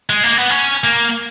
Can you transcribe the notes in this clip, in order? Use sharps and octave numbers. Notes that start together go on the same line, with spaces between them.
G#3
A#3
B3
C#4
A#3